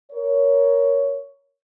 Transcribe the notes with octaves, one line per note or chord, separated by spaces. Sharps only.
A#4 C#5